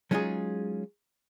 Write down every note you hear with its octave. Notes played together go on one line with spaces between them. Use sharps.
F#3 G#3 C#4 D#4 F4 G#4